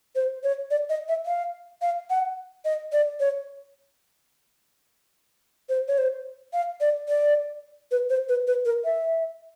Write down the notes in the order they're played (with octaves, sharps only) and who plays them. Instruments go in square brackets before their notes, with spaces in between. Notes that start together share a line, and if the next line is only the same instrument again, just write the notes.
[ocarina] C5
C#5
D5
D#5
E5
F5
F5
F#5
D#5
D5
C#5
C5
C#5
C5
F5
D5
D5
B4
C5
B4
B4
A#4
E5